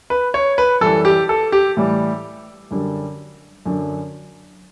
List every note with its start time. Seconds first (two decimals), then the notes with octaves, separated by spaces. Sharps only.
0.10 B4
0.34 C#5
0.58 B4
0.81 F#2 E3 G3 A4
1.05 G4
1.29 A4
1.52 G4
1.77 A2 E3 G3
2.71 F#2 D3 G3
3.66 F#2 D3 F#3